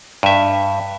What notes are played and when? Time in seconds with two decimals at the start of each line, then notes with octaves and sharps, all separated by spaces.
0.23 G2 E5